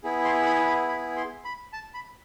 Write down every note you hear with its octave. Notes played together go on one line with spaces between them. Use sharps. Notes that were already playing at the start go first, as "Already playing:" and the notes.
B3 E4 G#4
C6
B5
B5
B5
C6
B5
A5
B5